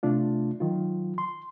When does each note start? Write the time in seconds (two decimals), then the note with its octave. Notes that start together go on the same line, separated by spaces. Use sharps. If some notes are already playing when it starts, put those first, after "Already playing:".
0.03 C3 A3 D4 F4
0.60 D#3 F#3 F4
1.18 C6